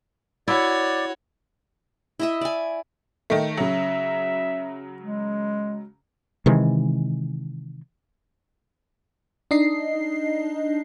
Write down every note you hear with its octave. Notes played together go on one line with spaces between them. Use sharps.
E4 F#4 C#5 D5
E4 D#5 E5
D5 G#5
D#3 A3
C#3 F#3 E5
G#3
C3 D#3 E3 G#3
D4 D#4 D#5 C7